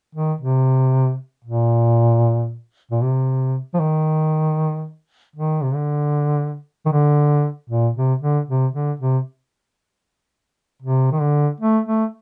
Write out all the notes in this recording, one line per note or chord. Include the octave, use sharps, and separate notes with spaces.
D#3
C3
A#2
A#2
C3
F3
D#3
D#3
C3
D3
D#3
D3
A#2
C3
D3
C3
D3
C3
C3
D#3
D3
A3
A3